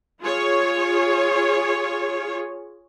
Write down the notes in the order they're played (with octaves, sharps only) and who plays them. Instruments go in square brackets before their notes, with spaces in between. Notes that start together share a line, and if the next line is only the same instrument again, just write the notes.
[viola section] F4 G#4 C#5